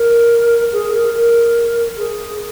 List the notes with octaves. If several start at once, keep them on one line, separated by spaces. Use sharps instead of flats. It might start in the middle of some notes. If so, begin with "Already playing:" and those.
Already playing: A#4
G#4
A#4
A#4
G#4